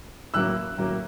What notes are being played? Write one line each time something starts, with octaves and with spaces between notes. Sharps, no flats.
A2 F#3 A#3 C#4 E6 F#6
A2 F#3 A#3 C#4